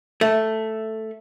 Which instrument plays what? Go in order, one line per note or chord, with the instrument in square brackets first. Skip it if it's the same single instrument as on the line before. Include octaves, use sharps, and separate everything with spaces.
[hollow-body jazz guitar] A3